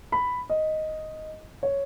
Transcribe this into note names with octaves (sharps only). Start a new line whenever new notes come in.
B5
D#5
C#5